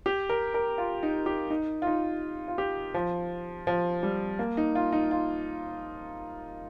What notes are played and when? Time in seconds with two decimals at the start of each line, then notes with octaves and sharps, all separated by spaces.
0.06 G4
0.29 A#4
0.54 A#4
0.78 F4
1.03 D#4
1.26 G4
1.50 D#4
1.82 F4
1.87 D#4
2.48 F4
2.58 G4
2.94 F3
3.67 F3
4.03 G3
4.39 A#3
4.57 D#4
4.75 F4
4.93 D#4
5.11 F4